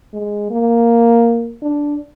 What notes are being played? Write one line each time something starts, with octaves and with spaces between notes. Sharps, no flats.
G#3
A#3
D4